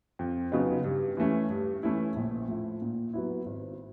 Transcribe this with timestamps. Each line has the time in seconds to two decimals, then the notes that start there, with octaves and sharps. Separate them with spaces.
0.19 F2
0.52 C#3 F#3 B3 D#4
0.84 G2
1.17 E3 A3 C#4
1.50 G2
1.83 E3 A3 C#4 E4
2.16 A#1
2.48 A2 F3
2.82 A#2
3.13 F#3 B3 E4
3.46 G#1